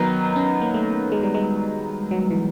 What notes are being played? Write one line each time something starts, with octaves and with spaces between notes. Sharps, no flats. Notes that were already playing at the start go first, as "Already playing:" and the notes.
Already playing: D#3 F#3 B3 D#4
C#4
A#3
A3
G#3
G3
G#3
F#3
E3